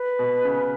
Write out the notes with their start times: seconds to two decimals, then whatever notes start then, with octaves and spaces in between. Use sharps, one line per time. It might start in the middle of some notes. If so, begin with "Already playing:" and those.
Already playing: B4
0.19 B2
0.45 C#3